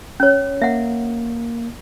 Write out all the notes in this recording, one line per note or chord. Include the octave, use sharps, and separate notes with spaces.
C#4 C#5
A#3 E5 F#5